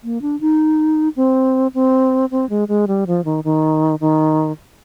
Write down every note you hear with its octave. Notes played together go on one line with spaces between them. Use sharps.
A#3
D4
D#4
C4
C4
C4
G#3
G#3
G3
F3
D#3
D#3
D#3